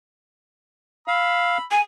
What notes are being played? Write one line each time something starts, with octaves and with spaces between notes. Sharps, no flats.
F5 B5 E6
G#5